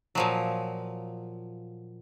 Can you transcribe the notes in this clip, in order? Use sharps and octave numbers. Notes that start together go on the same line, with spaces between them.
A#2 F3 F#3